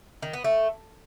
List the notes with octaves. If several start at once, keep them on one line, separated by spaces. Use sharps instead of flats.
D#3
B3
A3